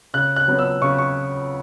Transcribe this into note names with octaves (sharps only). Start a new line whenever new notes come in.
C#3 F#6
F#6
F#3 B3
E6
C#3 C#6
C#6